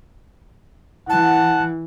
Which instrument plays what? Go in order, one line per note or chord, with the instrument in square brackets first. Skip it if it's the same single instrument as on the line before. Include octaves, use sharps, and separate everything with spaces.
[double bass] E3 [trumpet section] F#5 [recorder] A5